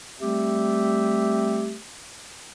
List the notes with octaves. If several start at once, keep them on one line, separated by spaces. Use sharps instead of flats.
G3 A3 C4 G4 E5